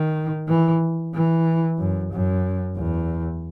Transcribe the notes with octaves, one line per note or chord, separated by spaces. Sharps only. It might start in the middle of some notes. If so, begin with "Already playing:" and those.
Already playing: D#3
E3
E3
F#2
F#2
E2